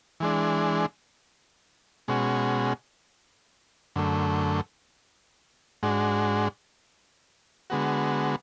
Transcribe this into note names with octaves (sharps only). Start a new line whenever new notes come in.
E3 G#3 D4
B2 G#3 C#4 F#4
F#2 D3 A3
G#2 G#3 D4 F#4
D3 G#3 B3 F#4